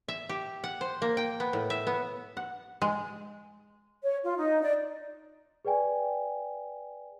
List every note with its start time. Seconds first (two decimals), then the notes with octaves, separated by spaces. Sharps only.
0.08 E5
0.29 G4
0.64 F#5
0.81 C5
1.02 A#3
1.17 G5
1.40 B3
1.53 A2
1.70 E5
1.87 B3
2.37 F#5
2.82 G#3
4.04 C#5
4.24 F4
4.38 D#4
4.63 D5
5.65 G#4 B4 D5 G5 G#5